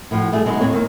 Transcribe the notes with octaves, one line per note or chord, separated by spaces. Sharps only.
A2 F3 F#4
G3 A3 F4 G#4
F#3 G#3 B3 D#4 G#4
D#2 A2 C4 C#5
D#3 A#3